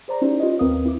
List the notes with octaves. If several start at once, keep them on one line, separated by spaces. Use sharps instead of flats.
G#4 C5 D5 A#5
C#4 D#4 E4 G4 C5 D5
F4 G4 B4 C#5 D#5
D#2 C4 A#4 B4 F5 D#6
C4 E4 A#4 D6